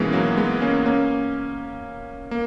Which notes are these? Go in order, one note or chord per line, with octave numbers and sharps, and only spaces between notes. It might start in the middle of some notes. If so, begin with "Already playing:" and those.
Already playing: G#2 B2 E3 G#3 A#3 B3 C#4
F#3 A#3
G#3 B3
A#3 C#4
A#3 C#4
A#3